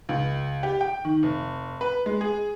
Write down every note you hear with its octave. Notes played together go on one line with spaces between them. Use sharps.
C#2
G4
G5
D#3
F1
B4
G#3
G#4